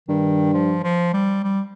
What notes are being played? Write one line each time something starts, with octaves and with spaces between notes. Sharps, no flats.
G2 D#3
F3
F3
G3
G3